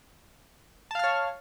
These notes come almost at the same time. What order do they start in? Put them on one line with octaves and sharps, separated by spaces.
A5 F5 F6 C#5